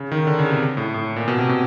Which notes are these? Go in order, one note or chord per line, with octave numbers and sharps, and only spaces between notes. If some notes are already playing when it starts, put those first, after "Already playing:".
Already playing: C#3
D#3
D3
C#3
C3
A2
A2
A#2
B2
C3
B2